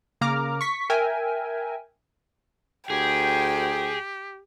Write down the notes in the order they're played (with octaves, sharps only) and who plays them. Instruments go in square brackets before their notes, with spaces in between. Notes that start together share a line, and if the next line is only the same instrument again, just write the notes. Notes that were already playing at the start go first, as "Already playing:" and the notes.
[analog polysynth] C#3 A#3 A#5 D6 F6
C#6 B6
A#4 E5 G5 G#5
[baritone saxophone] D2 [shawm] G4 [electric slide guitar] G#4 [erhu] G5